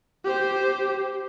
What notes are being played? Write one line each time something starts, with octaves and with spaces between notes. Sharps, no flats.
G4 C5